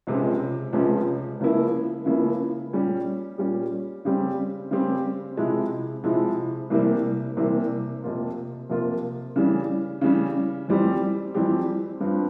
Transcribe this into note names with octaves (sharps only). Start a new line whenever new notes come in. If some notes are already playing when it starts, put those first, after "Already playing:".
C#2 C3 F3 G#3 C#4
C#2 C3 F3 G#3 C#4
C#2 C#3 F3 A#3 E4
C#2 C#3 F3 A#3 E4
A#2 G3 C#4 G4
A#2 G3 C#4 G4
C#3 G3 C4 G4
C#3 G3 C4 G4
C3 F3 G#3 E4
C3 F3 G#3 E4
C2 C3 E3 G3 A#3
C2 C3 E3 G3 A#3
F2 C3 F3 A#3 F4
F2 C3 F3 A#3 F4
C#3 E3 G3 C#4
C#3 E3 G3 C#4
F2 E3 G3 C4 G4
F2 E3 G3 C4 G4
G2 F3 C4